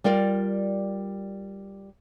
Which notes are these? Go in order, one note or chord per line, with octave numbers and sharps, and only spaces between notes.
G3 F4 A#4 D5